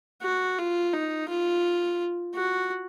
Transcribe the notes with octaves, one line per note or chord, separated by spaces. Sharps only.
F#4
F4
D#4
F4
F#4